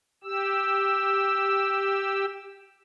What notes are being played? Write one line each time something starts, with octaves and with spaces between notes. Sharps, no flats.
G4 E6